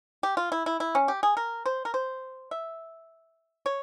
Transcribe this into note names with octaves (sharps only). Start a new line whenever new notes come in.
G4
F4
E4
E4
E4
C#4
G4
G#4
A#4
C5
A#4
C5
E5
C#5